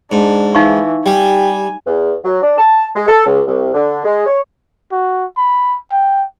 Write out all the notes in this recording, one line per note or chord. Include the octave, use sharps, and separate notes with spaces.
G#2 D4
E3 D#4 F5 C#6
G3 G4 G#5
E2
F#3
D4
A5
G#3
A4
C#2
C2
D3
G#3
C#5
F#4
B5
G5